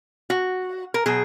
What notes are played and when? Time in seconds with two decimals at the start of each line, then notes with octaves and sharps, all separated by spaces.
0.30 F#4
0.94 A#4
1.06 B2 F#3 G#4